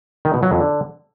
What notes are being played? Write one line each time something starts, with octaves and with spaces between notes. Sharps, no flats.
D#3
B2
F#3
F2
D3